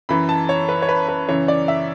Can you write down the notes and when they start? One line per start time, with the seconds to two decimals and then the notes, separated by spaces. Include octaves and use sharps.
0.09 F#2 E3 B5
0.29 A5
0.49 C#5
0.69 B4
0.82 C#5
0.89 B4
1.09 B4
1.28 F#2 C#3 E3 C#5
1.48 D5
1.68 E5